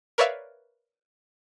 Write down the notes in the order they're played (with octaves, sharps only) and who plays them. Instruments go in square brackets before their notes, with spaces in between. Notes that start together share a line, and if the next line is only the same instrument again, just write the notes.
[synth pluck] A#4 B4 C#5 D5 E5 F5